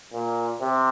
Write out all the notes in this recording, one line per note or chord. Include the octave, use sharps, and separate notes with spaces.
A#2
C3